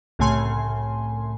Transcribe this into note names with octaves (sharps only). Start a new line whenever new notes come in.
C2 A2 C#3 A3 G#5 C6